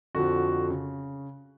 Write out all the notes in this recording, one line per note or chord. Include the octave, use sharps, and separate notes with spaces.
F2 D3 F3 F#4
C#3